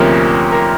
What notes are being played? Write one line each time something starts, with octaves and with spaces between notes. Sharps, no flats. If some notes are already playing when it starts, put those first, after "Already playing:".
Already playing: D2 C3 F3 A#3 C#4
A#4